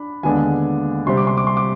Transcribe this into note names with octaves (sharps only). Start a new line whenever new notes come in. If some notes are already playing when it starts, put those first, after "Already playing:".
Already playing: D4 B5
D#2 D3 G#3 B3 D4 G#5
C3 G3 C4 C6
D6
C6
D6
C6
D6